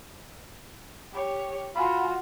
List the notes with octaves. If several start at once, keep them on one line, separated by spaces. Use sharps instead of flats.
G4 C#5
F4 F#4 G#5 B5